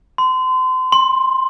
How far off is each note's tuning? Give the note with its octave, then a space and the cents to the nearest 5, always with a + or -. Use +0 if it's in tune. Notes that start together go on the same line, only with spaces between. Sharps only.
C6 -30
C6 +15